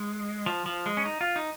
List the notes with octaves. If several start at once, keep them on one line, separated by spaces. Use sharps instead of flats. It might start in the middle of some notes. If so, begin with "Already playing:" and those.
Already playing: G#3
F3
F3
G#3
C#4
D#4
F4
D#4